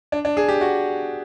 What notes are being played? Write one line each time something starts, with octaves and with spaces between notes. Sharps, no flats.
D4
D4
G#4
G4
F#4